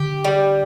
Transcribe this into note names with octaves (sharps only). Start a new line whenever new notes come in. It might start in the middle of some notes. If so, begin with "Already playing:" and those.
Already playing: D3 G4
G3